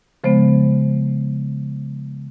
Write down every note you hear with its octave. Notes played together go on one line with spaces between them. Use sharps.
C#3 F3 G#3 B3 C5